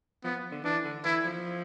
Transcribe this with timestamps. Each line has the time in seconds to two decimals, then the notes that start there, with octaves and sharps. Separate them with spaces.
0.24 F3 B3
0.51 D3
0.64 E3 D4
0.84 D3
1.04 E3 E4
1.25 F3